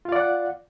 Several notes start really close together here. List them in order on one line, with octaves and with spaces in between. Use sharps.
F4 F5 D5 F#5